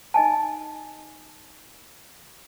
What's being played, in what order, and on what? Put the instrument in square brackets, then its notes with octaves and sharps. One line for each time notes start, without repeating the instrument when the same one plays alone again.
[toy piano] D#4 D#5 G#5 A5